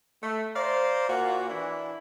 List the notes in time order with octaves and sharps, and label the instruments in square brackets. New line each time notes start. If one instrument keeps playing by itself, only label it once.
[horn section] A3
C5 D5 F5 A#5
A#2 A#3 F#4
E3 D4 E4